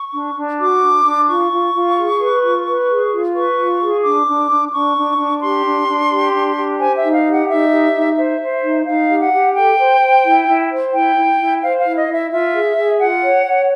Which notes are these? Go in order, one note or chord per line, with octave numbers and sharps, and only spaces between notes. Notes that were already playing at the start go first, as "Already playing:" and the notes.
Already playing: C#6
D4
D4
F#4 D6
D4
D4
F4 C#6
F4
F4
G#4
B4
F4
B4
G#4
F4
B4 C#6
F4
G#4
D4 D6
D4
D4
D4 C#6
D4
D4
G4 C6
D4
D4
G4
D4
G4
C5 G#5
E5
D#4
F5
G4
F#5
D#4 E5
G4
D#4
C5 E5
C5
D#4
D#4 F5
G4
F#5
G4
A4 G5
C5
C5
E4
E4
C5
E4 G5
E4
E4
C5 F5
F5
E4
D#5
E4
E5
F4 E5
G#4
G#4
F4 F#5
C#5
C#5